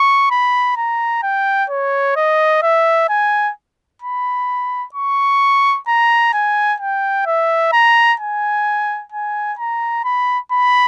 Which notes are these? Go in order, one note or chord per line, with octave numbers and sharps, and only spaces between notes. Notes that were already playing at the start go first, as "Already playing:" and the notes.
Already playing: C#6
B5
A#5
G5
C#5
D#5
E5
G#5
B5
C#6
A#5
G#5
G5
E5
A#5
G#5
G#5
A#5
B5
B5